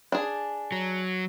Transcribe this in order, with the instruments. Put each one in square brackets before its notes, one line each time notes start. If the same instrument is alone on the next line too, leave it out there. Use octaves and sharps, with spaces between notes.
[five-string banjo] D4 G#4
[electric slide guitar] F#3